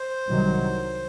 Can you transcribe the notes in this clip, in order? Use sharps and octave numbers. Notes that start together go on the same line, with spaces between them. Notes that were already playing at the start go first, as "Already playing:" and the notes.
Already playing: C5
C2 C3 D#3 F#3